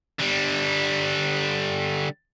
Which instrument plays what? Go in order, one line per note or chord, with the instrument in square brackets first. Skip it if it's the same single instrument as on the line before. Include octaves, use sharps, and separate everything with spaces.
[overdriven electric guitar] D3 G3